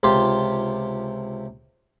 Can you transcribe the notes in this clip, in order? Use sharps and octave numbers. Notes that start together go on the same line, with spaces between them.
C#2 C3 F4 G4 C6